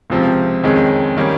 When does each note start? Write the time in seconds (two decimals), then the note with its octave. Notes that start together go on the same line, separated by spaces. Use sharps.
0.10 C#2 C3 F3 C4 F4
0.64 F2 D#3 G#3 C#4
1.17 D#3 G3 A#3 C#4